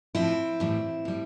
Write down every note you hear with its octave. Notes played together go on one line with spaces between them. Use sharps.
A2 F3 C4 E4
A2 E3 G3
A2 G3